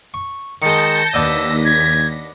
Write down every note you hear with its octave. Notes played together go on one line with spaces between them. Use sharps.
C#6
D#3 G#3 A5 G6 A#6 C#7
D#2 B3 D4 D#5 E6 A#6 B6
G#6